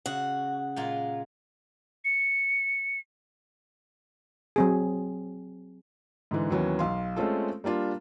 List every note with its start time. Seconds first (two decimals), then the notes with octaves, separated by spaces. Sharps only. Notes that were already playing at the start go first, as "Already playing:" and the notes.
0.06 C#3 F#4 F#5
0.76 A#2 G#3 F4
2.05 C#7
4.56 F#3 C4 G#4
6.31 G#2 D3 E3
6.50 D#2 E3 F#3 B3 C#4
6.79 B1 F5 C6
7.16 G#3 A3 C4 C#4 F4 A4
7.64 G3 A#3 D4 F4